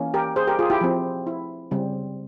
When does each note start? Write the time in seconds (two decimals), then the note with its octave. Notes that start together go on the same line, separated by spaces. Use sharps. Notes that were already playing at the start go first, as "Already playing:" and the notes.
Already playing: E3 A#3 C#4
0.14 G4 A#4
0.36 G#4 C5
0.47 G4 A#4
0.59 F4 G#4
0.70 E4 G4
0.81 F3 C4
1.27 E4
1.71 C#3 G3 C4